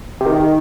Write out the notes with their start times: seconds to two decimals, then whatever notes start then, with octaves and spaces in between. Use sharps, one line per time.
0.21 C3
0.26 D#3